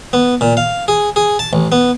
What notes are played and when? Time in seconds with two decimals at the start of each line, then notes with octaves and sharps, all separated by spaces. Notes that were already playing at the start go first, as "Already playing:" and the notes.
0.13 B3
0.41 A#2
0.57 F5
0.88 G#4
1.16 G#4
1.39 A5
1.53 A1
1.72 B3